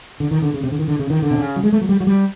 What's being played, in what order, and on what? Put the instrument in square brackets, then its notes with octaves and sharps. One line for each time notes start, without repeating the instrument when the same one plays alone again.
[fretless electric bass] D3
D#3
D3
C#3
C3
D3
D#3
D3
C#3
D#3
D3
C3
C#3
F#3
G#3
A3
F#3
G3
F#3
G3